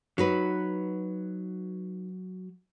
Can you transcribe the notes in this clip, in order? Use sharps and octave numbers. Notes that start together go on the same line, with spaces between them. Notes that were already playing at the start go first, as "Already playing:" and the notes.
F#3 D#4 F#4 B4